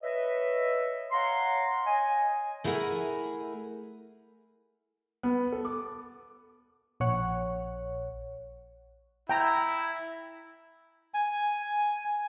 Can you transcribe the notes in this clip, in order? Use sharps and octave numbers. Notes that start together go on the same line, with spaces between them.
B4 C#5 D#5 E5
C#5 F5 F#5 A#5 C6
C#5 D#5 G#5
A3 E4 G#4 A#4 F#5 G#5
B3
A4
D6
A#1 C#5 F#5
E4 G5 A#5
G#5